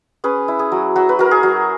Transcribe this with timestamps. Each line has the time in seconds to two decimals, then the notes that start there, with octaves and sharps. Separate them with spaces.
0.24 C#4 G#4 B4
0.48 E4
0.59 G#4
0.72 F#3
0.96 F#3 F#4
1.09 B4
1.19 F#3 A#4
1.31 G#4
1.43 F#3